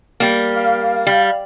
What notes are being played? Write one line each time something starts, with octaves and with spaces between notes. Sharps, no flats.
G3 A#3
F5
G3